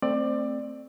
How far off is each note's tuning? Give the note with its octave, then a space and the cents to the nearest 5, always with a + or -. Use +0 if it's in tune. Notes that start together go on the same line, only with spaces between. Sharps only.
A3 +20 C4 +5 D5 +20